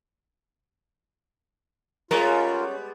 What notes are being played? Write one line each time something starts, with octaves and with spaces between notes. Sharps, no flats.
G3 G#3 B3 C#4 F4 A#4 C#5